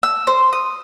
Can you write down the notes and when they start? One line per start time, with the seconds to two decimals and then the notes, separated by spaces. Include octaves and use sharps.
0.03 E6
0.27 C5
0.53 D#6